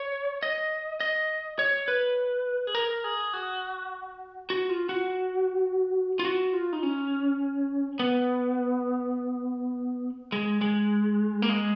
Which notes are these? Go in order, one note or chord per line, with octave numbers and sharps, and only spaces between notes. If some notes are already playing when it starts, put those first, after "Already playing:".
Already playing: C#5
D#5
D#5
C#5
B4
G#4
A#4
G#4
F#4
F#4
F4
F#4
F4
F#4
F4
D#4
C#4
B3
G#3
G#3
A#3
G#3